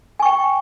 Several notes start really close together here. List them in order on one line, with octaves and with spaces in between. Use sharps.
G#5 C#6 G5